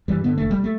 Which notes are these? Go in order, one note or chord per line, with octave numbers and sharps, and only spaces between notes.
G2 E3 G3
D3 B3
E1 A3
G3
A3